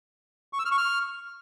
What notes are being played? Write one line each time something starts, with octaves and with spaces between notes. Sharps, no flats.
C#6
E6
F6
C#6
F6